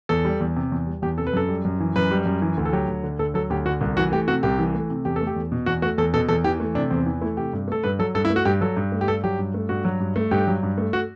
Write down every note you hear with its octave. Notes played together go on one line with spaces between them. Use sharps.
E2 A4
G3
E2
C3
E2
G3
E2 G4
C3 A4
B4
F#2 A4
G3
F#2
E3
F#2 B4
G3
F#2
E3
D2
A4
F#3 G4
D2
D3
D2 A4
F#3 A4
D2 G4
D3 F#4
C2
E3 F#4
A3 G4
C3 F#4
C2 G4
E3
A3
C3
E2 G4
A3 A4
G4
E2
B2
E2 F#4
A3 F#4
E2 A4
B2 A4
E2 A4
E3 G4
A3
C3 D4
E2 C4
E3
A3 E4
C3 G4
G2
A3 A4
G2 B4
F#3 A4
G2 A4
E4
A3
F#4
G2 G4
F#3 A4
G2
A3
G4
G2 A4
F#3 G4
G2
A3
G2 F#4
F#3
G2
A3
G2 G4
F#3
G2
A3
F#4